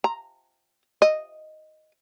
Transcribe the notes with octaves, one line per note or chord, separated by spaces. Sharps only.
A#5
D#5